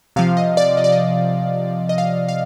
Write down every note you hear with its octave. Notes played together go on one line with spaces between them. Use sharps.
C3 F3 F5
D#5
D5
D#5
D5
D#5
D#5
F5
F5